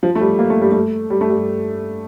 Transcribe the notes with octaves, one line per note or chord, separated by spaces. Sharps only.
F3
A3
G3
A#3
A3
G3
A3
G3
A3
G3